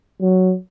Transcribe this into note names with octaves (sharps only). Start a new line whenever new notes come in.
F#3